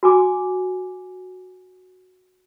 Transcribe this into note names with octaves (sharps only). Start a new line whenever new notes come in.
F#4 G#5 D6